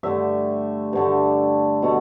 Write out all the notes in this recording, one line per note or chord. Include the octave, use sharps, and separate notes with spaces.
G2 D3 A3 E5
G2 D3 A3
B2 A3